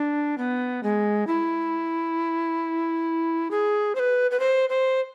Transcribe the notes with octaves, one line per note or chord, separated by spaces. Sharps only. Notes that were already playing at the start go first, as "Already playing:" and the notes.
Already playing: D4
B3
G#3
E4
G#4
C5
B4
B4
C5
C5